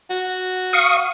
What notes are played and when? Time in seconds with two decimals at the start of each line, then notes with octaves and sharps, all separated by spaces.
0.10 F#4
0.73 F5 C#6 D#6